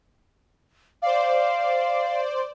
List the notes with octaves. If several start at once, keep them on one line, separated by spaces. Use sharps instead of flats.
C5 D5 F5